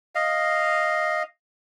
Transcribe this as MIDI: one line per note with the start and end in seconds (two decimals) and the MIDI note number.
0.15 1.23 75
0.15 1.23 77